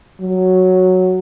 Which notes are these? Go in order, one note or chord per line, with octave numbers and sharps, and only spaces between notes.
F#3